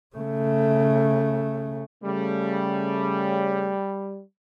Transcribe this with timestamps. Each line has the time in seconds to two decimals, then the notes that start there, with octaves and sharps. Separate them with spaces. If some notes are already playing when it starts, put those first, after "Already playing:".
0.16 C#3 A3
2.04 C#3 G3 A3